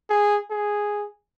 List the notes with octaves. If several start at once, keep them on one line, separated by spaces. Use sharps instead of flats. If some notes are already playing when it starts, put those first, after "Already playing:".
G#4
G#4